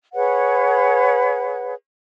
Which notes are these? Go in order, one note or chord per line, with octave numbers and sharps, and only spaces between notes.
G#4 B4 C#5 F#5